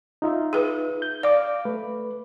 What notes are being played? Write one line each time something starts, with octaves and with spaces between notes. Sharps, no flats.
D#4 F4 E5
G#4 B4
G6
D5 F5 D6
A3 B4